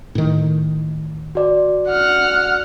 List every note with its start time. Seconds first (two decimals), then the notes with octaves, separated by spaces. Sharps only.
0.15 A2 D#3
1.35 F#4 D5
1.89 F#5 F6